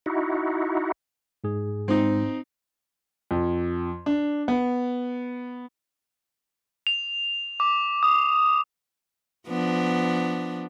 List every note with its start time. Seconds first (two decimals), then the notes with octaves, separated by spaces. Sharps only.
0.06 D#4 E4 F#4
1.44 G#2 G#4
1.88 G#2 C4 D#4
3.31 F2
4.06 D4
4.48 B3
6.87 F7
7.60 D6
8.03 D#6
9.48 F3 B3 D4